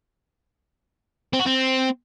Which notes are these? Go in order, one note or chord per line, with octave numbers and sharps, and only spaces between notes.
C4
F#4
C4